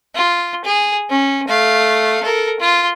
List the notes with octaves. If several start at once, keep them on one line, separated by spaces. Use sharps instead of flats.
F4
G#4
C#4
A3 F5
A4 A#4
F4